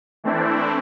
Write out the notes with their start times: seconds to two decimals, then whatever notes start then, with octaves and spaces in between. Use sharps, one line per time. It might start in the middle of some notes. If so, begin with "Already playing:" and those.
0.24 E3 A3 C4 D4 E4